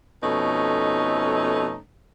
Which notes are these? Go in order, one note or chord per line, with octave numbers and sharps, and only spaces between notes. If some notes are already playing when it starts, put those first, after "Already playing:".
F2 B2 A3 C#4 D#4